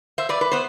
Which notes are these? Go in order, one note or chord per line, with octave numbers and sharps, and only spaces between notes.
C5 E5
B4 D5
B4
B3 C5